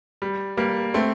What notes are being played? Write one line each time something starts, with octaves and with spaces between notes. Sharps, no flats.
G3
G3 A#3
A3 C4